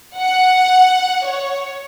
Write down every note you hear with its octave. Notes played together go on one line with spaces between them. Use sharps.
F#5
C#5